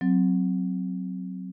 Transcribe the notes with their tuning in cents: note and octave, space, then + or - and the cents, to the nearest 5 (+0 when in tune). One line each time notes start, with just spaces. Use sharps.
F#3 +0 C4 +0